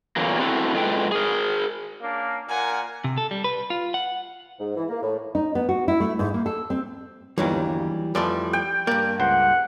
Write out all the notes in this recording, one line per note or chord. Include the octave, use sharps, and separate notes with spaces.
E2 A#2 D3 E3 F#3 A#3
C4 E4 F#4 A4
G#2 G#3 F4 A4 B4 G5
G#4 A#4
A#3 C#4 D4
A#2 A#4 F#5 G#5
C3
A4
G3
B4
F4
F#5
G#2
E3
A#3
A2
D#4
B3
F#4
E4
A3
G#2
A#3
A4
C4
G1 D#2 E3 F#3 G3
F2 E3 F3 G3 A3 D5
G5
G2 A#3 D5
C#2 C5 F#5